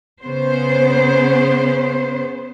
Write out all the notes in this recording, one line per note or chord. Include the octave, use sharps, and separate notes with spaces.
C#3 B3 C5